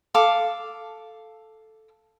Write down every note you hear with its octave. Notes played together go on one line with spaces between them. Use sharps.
A4 F5 D6